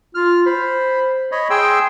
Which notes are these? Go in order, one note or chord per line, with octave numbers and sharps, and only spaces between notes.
F4 F6
C5 B5
C#5 D#5 B5
G#4 G5 C6 E6